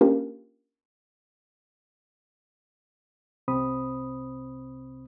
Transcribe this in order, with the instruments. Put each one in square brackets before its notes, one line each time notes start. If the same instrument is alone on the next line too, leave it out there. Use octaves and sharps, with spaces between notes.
[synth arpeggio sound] A#3 C#4 D4 F4 G4 A#4
[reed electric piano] C2 C3 C4 C5 B5 D#6